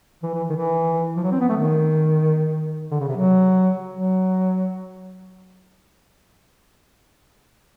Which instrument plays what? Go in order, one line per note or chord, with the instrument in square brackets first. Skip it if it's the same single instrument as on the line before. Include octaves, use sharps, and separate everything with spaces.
[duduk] E3
E3
D#3
E3
F3
F#3
C4
B3
A3
D#3
D3
C#3
C3
F#3
F#3